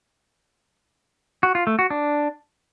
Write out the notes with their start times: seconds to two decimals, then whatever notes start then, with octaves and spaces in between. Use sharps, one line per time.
1.43 F#4
1.55 F4
1.67 A3
1.79 F#4
1.90 D4